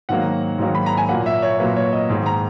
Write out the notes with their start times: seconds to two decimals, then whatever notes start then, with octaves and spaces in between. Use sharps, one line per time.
0.09 G#2 D#3 F#3 A#3 F#5
0.58 G#2 D#3 F#3 A#3
0.75 B5
0.86 A#5
0.97 G#5
1.09 A#2 F#3 A#3 F#5
1.26 E5
1.42 C#5
1.59 A#2 F#3 A#3 B4
1.76 C#5
1.92 D#5
2.10 G#2 D#3 A#3
2.26 A#5